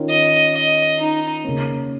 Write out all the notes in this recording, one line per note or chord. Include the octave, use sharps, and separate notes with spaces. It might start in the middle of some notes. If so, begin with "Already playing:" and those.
Already playing: D#3 C#4 F4 A#4
D#5
D#5
D#4
C#3 A#3 C#4